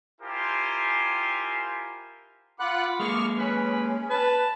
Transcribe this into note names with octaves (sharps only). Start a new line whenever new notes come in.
E4 F4 G4 A#4 C5 G#5
F4 F#5 B5 D6 F#6
G#3 A#3 C#6 F6
C#4 B4
B4 A5